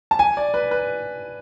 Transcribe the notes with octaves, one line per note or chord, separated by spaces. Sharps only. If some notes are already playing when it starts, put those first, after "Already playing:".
A5
G#5
D5
B4
B4